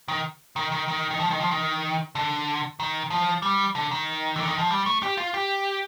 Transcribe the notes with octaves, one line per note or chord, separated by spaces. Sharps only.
D#3
D#3
D#3
D#3
D#3
F3
D#3
F3
D#3
D3
D#3
F3
G3
D3
D#3
D3
D#3
F3
G3
A3
G4
F4
G4